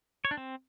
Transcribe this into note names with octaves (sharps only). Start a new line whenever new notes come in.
C#5
D4
C4